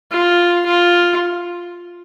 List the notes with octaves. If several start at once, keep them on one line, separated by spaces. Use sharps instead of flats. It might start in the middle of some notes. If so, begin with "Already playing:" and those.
F4
F4